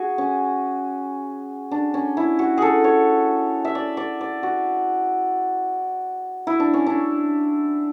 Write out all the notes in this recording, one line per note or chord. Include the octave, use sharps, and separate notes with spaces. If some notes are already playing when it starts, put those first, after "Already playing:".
Already playing: F#4 G#4
C#4
D4
C#4
E4
F#4
G#4 A4
C#5
E5
D5
D5
D5
F#4
E4
D4
C#4
D4